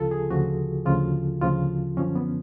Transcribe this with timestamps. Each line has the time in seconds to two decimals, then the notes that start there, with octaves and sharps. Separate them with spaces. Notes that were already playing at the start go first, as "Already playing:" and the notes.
Already playing: D2 C#3 F3 F4 A4
0.11 G#4
0.30 D2 C#3 F3 F#4
0.86 D2 C#3 F3 F4
1.41 D2 C#3 F3 F4
1.97 F#2 D3 F3 C#4
2.15 B3